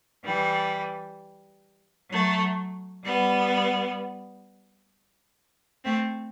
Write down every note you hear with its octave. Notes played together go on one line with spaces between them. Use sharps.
E3 G3
F#3 A3
G3 B3
A3 C4